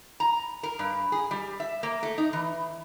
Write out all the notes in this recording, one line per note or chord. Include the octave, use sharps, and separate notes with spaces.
A#5
A#4
G2
G#4
G3
E5
A#3
A3
D#4
E3